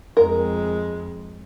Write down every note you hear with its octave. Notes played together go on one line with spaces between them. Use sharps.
F2 G#3 A#4